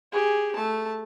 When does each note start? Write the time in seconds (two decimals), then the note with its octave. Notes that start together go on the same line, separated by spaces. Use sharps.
0.12 G4 G#4
0.55 A3 A5